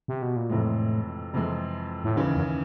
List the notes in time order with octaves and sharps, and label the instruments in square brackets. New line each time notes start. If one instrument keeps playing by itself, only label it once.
[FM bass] C3
B2
A#2
[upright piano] F2 C3 E3 G#3 [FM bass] A2
[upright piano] F2 C3 E3 G#3
[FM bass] A2
[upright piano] D#2 C#3 E3 [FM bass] G#2
[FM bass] F#2